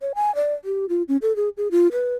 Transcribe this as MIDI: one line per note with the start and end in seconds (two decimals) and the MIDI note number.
0.02 0.13 73
0.15 0.34 80
0.35 0.54 74
0.65 0.86 67
0.89 1.03 65
1.08 1.17 61
1.22 1.35 69
1.36 1.49 68
1.57 1.68 68
1.71 1.88 65
1.92 2.15 71